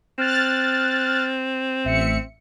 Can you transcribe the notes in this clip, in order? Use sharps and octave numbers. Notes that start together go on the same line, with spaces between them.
C4 F6 F#6 A6
A1 E5 C#7